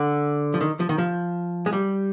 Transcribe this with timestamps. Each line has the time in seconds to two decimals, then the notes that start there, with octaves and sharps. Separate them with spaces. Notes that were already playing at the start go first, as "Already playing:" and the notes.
Already playing: D3
0.54 F3
0.61 D#3
0.80 F3
0.89 D#3
0.98 F3
1.66 G#3
1.73 G3